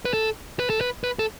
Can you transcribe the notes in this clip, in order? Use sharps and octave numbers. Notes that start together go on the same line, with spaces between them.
B4
A4
B4
A4
B4
B4
A4